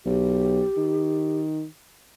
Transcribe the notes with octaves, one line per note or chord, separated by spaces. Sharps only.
B1 G4
D#3